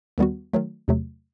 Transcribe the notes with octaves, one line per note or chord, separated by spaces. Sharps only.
D#2 D#3 G3 B3 F#4
D#3 F#3 A3
E2 C3 F#3 A3